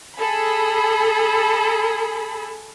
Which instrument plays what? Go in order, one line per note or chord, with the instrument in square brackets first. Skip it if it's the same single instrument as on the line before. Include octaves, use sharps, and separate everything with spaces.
[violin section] G#4 A4 B5